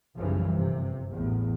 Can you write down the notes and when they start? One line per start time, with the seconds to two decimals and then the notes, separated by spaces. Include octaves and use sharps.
0.17 B1 F#2 C#3 E3 F3 G3
0.52 G1 C3
1.12 A1 E2